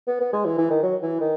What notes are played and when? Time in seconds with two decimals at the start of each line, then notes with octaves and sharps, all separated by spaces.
0.07 B3
0.20 B3
0.33 G#3
0.45 E3
0.58 E3
0.70 D#3
0.83 F#3
1.02 E3
1.20 D#3